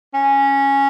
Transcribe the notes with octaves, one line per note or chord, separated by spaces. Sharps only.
C#4